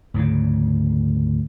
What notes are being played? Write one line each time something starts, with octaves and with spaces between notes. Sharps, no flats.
D2 G#2 C#3